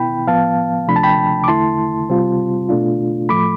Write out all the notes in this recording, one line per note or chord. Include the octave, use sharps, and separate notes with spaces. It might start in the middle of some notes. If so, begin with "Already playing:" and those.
Already playing: B2 B3 E4 G5 B5
A2 F3 B3 F5 A5
D2 C3 F3 A3 D4 B5
A5
G5 B5
D6
E2 D3 A3 E4 A5 C6
C3 G3 C4 F4
B2 A3 D4 F4
A2 F3 A3 B5 D6